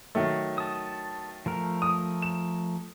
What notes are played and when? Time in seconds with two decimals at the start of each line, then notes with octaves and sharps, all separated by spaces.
0.15 D#3 F#3 A3
0.58 A5 D#6
1.46 F3 A3 A#4
1.82 D#6
2.22 E7